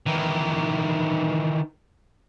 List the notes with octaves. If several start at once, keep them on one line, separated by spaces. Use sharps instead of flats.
D#3 E3